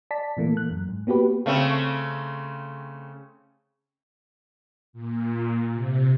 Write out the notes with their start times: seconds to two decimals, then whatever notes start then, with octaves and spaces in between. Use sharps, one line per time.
0.11 D5 A5 B6
0.37 A#2 E3 A3 A#3
0.57 F#6
0.71 F#2
0.89 G#2
1.07 A#3 B3 F#4 G4 B4
1.46 C#3 A3 C4
4.93 A#2
5.72 C3